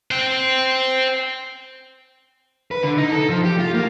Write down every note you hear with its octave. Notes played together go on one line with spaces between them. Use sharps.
C5 G5
B4
D3
D#4
A4
F3
G4
F4
A#3